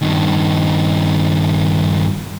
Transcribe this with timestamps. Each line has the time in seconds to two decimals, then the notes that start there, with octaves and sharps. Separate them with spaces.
0.02 G2 D#3